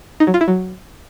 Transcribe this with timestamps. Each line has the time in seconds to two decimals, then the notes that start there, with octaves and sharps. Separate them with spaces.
0.20 D#4
0.27 F#3
0.34 F4
0.41 E4
0.48 F#3